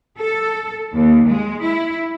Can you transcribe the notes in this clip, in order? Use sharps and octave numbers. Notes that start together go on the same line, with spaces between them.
A4
D#2
G#3
E4